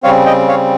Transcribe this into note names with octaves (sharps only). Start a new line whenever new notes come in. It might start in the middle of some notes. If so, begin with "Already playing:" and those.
C#3 G3 C4 C#5 F5
D#5 G5
C#5 F5